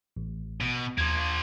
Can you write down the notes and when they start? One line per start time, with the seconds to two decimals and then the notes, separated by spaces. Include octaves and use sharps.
0.17 A1
0.61 B2
0.98 D#2 F3 A#3 G#6